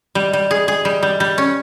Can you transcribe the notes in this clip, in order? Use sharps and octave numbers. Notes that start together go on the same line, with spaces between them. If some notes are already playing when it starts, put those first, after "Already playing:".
G3
G3
G#4
G#4
G3
G3
G3
C#4